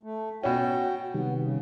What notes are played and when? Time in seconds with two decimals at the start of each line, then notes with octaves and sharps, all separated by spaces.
0.03 A3
0.43 B2 C#4 F#4 G5
1.14 C3 D#3 G3 B3
1.42 C#3